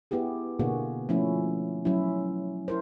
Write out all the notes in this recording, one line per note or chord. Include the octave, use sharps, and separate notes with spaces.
B3 E4 G4 G#4
B2 D3 A#3 B3 F#4 G#4
F3 A3 C#4 E4
F#3 C#4 E4
E4 A#4 C5